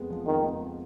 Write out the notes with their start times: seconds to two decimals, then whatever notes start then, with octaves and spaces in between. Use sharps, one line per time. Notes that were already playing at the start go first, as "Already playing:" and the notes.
Already playing: F2 G#3 B3
0.10 F3
0.26 F2 D#3
0.43 B3
0.60 G#3